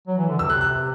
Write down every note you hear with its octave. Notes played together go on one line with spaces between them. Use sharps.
F#3
E3
D3
C3 E6
F#6
F#6